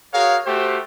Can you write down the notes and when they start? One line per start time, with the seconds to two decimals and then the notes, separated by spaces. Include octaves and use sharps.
0.13 F#4 G#4 A#4 C#5 F5
0.46 A3 F#4 G4 C5